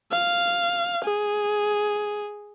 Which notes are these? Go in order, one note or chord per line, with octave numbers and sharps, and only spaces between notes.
F5
G#4